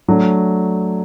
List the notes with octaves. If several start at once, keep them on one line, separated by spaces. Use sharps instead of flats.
F#3 A3 D4